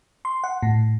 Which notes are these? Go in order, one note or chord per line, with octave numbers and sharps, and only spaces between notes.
C6
F#5
A2